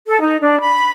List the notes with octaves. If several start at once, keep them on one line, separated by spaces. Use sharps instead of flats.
A4
D#4
D4
B5